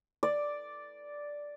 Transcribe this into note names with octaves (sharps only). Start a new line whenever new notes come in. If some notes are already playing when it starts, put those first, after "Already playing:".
D5